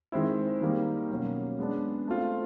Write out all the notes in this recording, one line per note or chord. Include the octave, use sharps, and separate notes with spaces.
D#3 G#3 C4 E4
D#3 G3 A#3
B2 F#3 A#3 C#4
G#3 B3 D4
A3 C4 F4